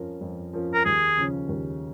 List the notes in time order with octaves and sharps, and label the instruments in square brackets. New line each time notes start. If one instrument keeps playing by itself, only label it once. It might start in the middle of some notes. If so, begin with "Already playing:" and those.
Already playing: [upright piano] F2 F3 C#4 A#4
F2
F3 C#4 A#4
[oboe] A#4
[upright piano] D#2 [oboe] G#4
[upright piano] C#3 F3 C#4
D#2